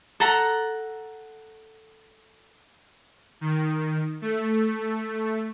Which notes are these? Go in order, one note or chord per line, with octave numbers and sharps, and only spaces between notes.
A4 F#5 A#5
D#3
A3